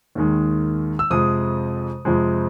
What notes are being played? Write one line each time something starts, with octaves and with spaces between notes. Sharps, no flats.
D#2 D#3 G#3
E6
F2 C3 F3 G#3 D#6
F2 C3 F3 G#3